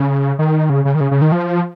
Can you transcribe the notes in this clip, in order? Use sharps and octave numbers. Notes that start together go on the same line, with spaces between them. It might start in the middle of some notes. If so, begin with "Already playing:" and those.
Already playing: C#3
D#3
C#3
C#3
D#3
C#3
C#3
D#3
F3